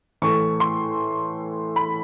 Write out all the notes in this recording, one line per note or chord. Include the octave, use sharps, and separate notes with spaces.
A2 E3 A3 C#6
C6
B5